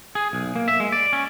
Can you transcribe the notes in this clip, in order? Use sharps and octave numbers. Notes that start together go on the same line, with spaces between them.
G#4
B1
A#3
E5
G#3
D5
C#4